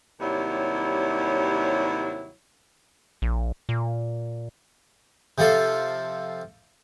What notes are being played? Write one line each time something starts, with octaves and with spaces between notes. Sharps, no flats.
D#2 C3 F#3 G3 E4 C#5
A#1
A#2
C3 F3 F4 A4